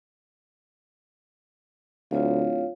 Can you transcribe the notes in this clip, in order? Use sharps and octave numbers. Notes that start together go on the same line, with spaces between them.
D1 D2 F4 C#5 F5